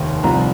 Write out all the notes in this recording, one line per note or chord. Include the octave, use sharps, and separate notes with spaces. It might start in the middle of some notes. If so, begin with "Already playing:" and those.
Already playing: F1 D#2 D#3
C2 C3 F3 A#5